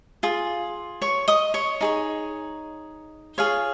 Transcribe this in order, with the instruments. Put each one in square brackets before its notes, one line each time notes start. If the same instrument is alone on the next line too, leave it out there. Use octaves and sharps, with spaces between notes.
[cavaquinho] F4 G#4
C#5 C#6
D#5 D#6
C#5 C#6
D#4 G#4 C#5
F4 G#4 C#5 F5